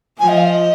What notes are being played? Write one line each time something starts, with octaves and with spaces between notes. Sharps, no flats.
F3 G#5
D#5
F5
D#5